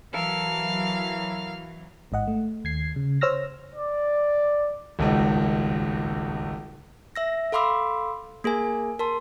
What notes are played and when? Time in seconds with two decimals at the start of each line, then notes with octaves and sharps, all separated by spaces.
0.14 E3 F#3 A4 A#4 E5 F5
2.12 A1 G#2 D#5 F#5
2.28 A3
2.64 D#2 G#6 C7
2.96 C#3
3.21 C5 C#5 E6 F6 A#6
3.74 D5
4.99 D#1 G#1 C#2
7.16 E5 E6 A#6
7.52 A4 F5 B5 C6 D6 E6
8.44 A#3 G#4 A#4 G#5
8.99 A#4 A5 C6